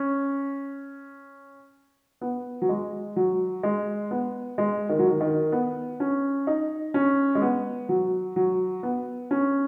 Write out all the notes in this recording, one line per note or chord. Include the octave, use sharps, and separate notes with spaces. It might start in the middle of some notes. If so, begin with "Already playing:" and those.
Already playing: C#4
B3
F#3
G#3
F#3
G#3
B3
G#3
D#3
F#3
D#3
D#3
B3
C#4
D#4
C#4
G#3
B3
F#3
F#3
B3
C#4